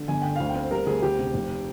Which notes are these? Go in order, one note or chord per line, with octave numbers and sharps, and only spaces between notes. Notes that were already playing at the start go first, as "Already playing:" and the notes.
Already playing: D3
G1 G#5
D3 G5
D2 F5
G5
C4
G3 A#4
D2 G#4
D2 G4
C3
F1